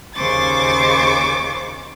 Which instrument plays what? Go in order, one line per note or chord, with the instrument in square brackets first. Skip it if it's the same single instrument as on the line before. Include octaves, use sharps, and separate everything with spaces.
[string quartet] D#2 C#3 C5 C#6 D6 A6